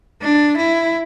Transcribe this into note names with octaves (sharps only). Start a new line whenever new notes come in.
D4
E4